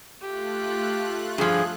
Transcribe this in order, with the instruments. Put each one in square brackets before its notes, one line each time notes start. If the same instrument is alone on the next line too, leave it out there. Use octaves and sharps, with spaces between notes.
[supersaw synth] A3 F4 F#6 [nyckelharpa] G4
[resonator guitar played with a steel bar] G2 F3 [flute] G#4